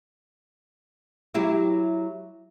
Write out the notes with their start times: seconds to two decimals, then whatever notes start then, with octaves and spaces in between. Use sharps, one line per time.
1.34 F#3 E4 G4